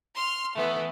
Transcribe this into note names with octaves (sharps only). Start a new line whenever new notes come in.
C6 F6
E3 A3 B3